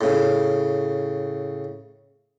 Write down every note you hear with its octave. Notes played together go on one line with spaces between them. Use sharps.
A2 C#3